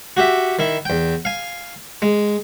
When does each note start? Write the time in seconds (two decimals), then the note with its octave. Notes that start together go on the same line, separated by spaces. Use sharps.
0.17 F#4 G4 E5
0.59 D#3 E4
0.85 E2 G5
1.25 F5 G#5
2.02 G#3